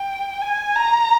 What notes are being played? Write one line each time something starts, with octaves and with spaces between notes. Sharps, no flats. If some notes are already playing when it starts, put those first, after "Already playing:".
Already playing: G5
G#5
A#5